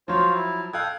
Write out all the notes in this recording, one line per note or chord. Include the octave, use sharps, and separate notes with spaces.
F3 F#3 F4 C5 C#5
E4
A4 F5 G5 D#6 F#6 G#6